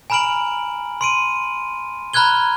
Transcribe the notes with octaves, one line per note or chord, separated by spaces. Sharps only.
G#5 A#5 B5 F6 D7 F#7
C6 D7 D#7
A#5 B5 F6 F#6 G#6 G7